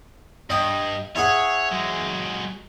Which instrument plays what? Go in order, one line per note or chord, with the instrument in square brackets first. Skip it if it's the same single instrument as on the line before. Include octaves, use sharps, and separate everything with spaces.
[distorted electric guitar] G2 [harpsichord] D#5 G5
[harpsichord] E4 G#4 F#5 [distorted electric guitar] C#5
[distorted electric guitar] F#3 G#3